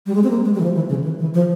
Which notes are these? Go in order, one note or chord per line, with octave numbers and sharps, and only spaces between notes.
G3
G#3
C4
A#3
G#3
G3
E3
F3
E3
C#3
E3
E3
F3